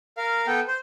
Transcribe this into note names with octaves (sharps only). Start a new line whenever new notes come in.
A#4 F5
B3 A4 G5
C5